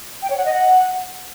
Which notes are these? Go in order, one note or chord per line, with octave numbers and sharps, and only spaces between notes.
G5
C#5
F#5
D#5
F#5